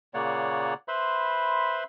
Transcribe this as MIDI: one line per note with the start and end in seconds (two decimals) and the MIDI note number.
0.14 0.74 46
0.14 0.74 49
0.14 0.74 58
0.14 0.74 73
0.14 0.74 74
0.14 0.74 78
0.88 1.84 71
0.88 1.84 72
0.88 1.84 76
0.88 1.84 83
0.88 1.84 84